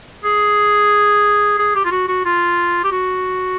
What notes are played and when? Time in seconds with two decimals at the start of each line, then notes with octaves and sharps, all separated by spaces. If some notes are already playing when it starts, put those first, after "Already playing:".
0.24 G#4
1.59 G#4
1.75 G4
1.85 F4
1.91 F#4
2.08 F#4
2.25 F4
2.84 G4
2.92 F#4